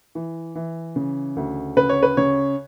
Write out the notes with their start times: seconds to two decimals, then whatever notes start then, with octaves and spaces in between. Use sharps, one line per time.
0.15 E3
0.55 E3
0.96 C#3
1.36 D2
1.77 C#3 B4
1.89 C#5
2.03 B4
2.17 C#3 C#5